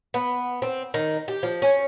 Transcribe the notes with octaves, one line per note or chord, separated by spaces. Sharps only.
B3
C4
D#3
G4
F3
C#4